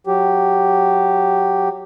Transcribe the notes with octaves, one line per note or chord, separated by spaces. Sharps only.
F#3 G4